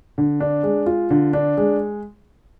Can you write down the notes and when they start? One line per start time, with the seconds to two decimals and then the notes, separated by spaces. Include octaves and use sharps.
0.18 D3
0.40 D4
0.63 G#3
0.86 F4
1.10 D3
1.33 D4
1.57 G#3